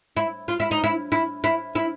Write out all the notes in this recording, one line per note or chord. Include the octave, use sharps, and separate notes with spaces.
E4
F4
E4
D#4
E4
E4
E4
E4